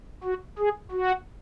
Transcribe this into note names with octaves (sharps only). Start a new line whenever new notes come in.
F#4
G#4
F#4